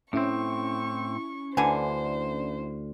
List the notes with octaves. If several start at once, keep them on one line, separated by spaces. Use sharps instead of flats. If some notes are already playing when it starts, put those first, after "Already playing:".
A2 C4 C#4 E4 C#6
D2 D3 E3 C5 G#5